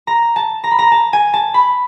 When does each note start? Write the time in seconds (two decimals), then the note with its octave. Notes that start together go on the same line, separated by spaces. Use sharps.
0.07 A#5
0.36 A5
0.64 A#5
0.71 B5
0.79 A#5
0.92 A5
1.13 G#5
1.34 A5
1.54 B5